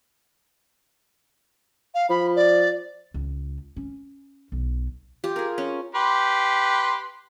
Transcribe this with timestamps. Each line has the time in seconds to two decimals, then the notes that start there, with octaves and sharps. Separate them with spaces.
1.95 F5
2.10 F3 B5
2.36 D5
3.14 C#2
3.76 C#4
4.52 B1
5.24 F4 G4
5.36 G#4 A#4
5.58 C#4
5.95 G4 B4 C6